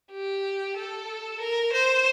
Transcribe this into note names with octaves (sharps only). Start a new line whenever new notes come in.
G4
A4
A#4
C5